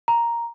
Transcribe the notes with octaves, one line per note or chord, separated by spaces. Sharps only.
A#5